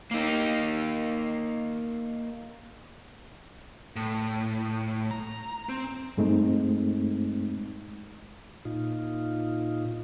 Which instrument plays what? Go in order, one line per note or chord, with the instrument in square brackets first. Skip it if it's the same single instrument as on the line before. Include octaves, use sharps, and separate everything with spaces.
[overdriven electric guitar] A#3 D#4
[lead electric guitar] A2
A#5
C4
[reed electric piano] G2 G#3 A3 C4 D#4
[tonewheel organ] A#2 D#4 F4